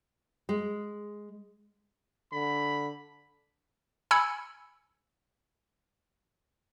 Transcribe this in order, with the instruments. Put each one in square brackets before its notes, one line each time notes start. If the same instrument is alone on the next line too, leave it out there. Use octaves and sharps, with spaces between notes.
[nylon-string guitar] G#3
[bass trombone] D3 [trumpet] B5
[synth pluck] G#5 B5 E6 G#6 C#7